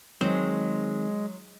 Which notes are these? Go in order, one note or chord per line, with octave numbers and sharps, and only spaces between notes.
D#3 F#3 G#3 C4 C5